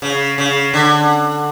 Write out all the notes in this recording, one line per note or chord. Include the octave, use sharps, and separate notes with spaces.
C#3
C#3
D3